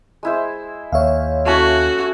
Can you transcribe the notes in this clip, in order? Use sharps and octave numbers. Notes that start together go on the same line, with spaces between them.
G#3 E4 C5
D#2 C#5 E5 F5
A3 C#4 E4 F#4